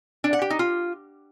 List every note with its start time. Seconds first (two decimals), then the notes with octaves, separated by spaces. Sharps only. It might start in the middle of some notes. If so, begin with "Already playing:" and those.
0.24 D4
0.33 F#5
0.42 G4
0.50 D#4
0.59 F4